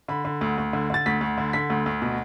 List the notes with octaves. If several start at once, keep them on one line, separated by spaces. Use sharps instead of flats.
D3 B5
D3
D2
D2
D3
D3 A6
D2 B6
D2
D3
D3 B6
D2
D2
B2